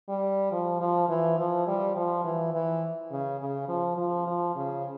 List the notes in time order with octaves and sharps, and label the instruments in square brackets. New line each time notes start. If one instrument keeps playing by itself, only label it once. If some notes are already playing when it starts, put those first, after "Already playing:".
[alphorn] G3
F3
F3
E3
F3
G3
F3
E3
E3
C#3
C#3
F3
F3
F3
C#3